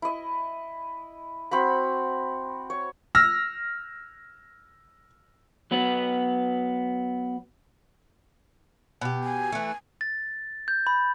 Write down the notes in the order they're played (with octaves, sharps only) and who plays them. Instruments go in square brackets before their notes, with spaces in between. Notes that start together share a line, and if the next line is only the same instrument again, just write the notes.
[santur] E4 D#5
C4 F#4 B5
C#5
[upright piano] E6 F6 A#6
[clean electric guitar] F#3 B3 B4
[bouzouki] B2 G4
[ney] G#5
[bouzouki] E3 A3
[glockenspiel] A6
G6
B5